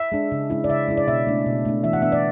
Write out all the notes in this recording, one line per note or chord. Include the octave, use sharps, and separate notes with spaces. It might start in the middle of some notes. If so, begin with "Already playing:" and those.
Already playing: E5
G#3 D4
C#3
G#3 C#4 E4
D5
C#3 E5
G#3 C#4 E4
D5
B2 E5
A3 D4
B2
A3 D4
E3 E5
F#5
B3 D4 E5
D5